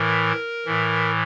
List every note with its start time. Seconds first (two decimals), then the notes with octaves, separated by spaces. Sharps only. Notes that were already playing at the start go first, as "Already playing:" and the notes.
Already playing: A2 E3 A#4
0.65 A2 E3